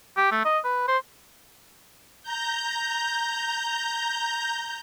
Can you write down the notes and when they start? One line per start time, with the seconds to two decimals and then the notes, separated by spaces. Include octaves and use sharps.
0.17 G4
0.31 A3
0.45 D#5
0.64 B4
0.88 C5
2.23 A#5 G6